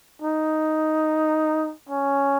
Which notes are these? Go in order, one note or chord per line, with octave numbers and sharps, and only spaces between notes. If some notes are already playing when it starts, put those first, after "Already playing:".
D#4
C#4